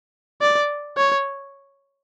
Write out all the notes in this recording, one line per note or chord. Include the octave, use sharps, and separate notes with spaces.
D5
C#5